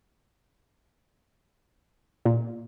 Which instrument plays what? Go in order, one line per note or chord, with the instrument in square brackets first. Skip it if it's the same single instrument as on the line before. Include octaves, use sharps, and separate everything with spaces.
[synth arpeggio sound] A#2